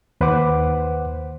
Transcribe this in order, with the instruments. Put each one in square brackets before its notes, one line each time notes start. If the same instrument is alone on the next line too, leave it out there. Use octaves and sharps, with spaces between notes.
[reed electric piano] D#2 B4 C5 F#5 D6